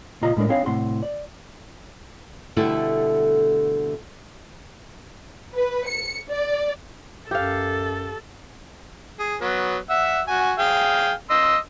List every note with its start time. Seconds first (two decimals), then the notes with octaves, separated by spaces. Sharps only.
0.22 C#2 A#2 F4 D#5 A#5
0.37 A2 G#3 D4 A#4
0.49 C4 D4 D#4 G#4 C#5 F5
0.66 C2 A2 C4 F#5 C6
1.03 D5
2.56 B2 D3 G3 A3 E4 A4
5.54 B4
5.87 C#7
6.29 D5
7.31 F#2 G4 A4 F5
9.19 G#4
9.41 F#3 B3
9.90 E5 F#5
10.28 F#4 G#5
10.59 G#4 F5 G5
11.30 D#5 C6 E6